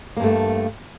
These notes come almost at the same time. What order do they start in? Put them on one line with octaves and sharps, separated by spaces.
A#3 G2 A3